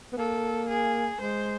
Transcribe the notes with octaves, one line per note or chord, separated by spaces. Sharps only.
B3
A#3 A4
G#4
G#3 C5